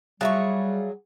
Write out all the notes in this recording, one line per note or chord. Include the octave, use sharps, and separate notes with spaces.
F#3 G3 F4 G#4 E5 C#6